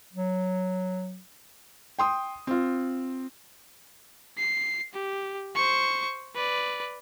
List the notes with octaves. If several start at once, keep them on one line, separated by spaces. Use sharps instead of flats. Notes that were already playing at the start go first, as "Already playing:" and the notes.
F#3
G5 C6 D#6
C4 F4
C7
G4
C5 C#6
B4 D5